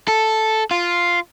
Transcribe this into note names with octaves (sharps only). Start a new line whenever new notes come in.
A4
F4